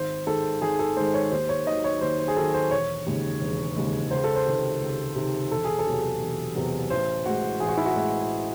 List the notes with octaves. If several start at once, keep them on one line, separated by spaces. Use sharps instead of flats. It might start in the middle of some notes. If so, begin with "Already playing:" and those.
Already playing: G#1 C5
G#2 D#3 G#3 A4
G#1 G#4
A4
G#2 D#3 G#3 C5
C#5
D#2 C5
C#5
D#3 F#3 D#5
C#5
D#2 C5
C5
G#4
D#3 F#3 A4
C5
E1 C#5
D#2 C#3 G#3
E1
D#2 C#3 G#3
C#2 C5
A4
C5
C3 D#3
C#2
C3 D#3
E1 A4
G#4
A4
E2 C3 F#3
E1
E2 C3 F#3
A1 C5
A2 G#3 F#4
A1 G#4
F#4
E4
F#4
A2 G#3